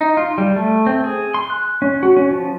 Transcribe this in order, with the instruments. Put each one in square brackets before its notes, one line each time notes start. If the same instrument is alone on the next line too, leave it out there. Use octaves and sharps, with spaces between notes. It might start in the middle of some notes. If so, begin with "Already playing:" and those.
[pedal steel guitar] D#4
F4
G3
A3
C4
G#4
C6
F#6
C#4
F#4
C#4
F3